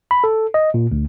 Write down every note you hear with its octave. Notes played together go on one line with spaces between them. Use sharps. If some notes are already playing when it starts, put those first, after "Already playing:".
B5
A4
D#5
A#2
D2